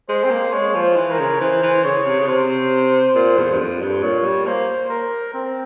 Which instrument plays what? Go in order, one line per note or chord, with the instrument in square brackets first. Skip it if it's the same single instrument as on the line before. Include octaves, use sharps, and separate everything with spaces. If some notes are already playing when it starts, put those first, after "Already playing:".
[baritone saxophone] G#3 [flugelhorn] C5
[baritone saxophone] C4
A#3
[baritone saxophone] G#3 [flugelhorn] C#5
[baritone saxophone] F3
[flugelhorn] C5
[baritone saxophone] E3
[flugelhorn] A#4
[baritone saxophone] C#3
[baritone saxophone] E3 [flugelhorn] C5
[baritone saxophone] E3
[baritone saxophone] C#3 [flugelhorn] C#5
[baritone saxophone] C3
C#3
[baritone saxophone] C3 [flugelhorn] C5
[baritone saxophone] A#2
E2
G2
F2
G2
[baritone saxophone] A#2 [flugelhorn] C#5
[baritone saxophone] G3
[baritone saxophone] A#3 [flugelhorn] C5
[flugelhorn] A#4
C4